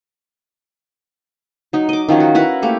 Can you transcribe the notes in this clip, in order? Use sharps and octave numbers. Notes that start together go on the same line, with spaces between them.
F#3 D#4
D#5 D6
D#3 F3 F#3 C#4
F#4
E4 A#4 B4 F#5
A3 A#3 G4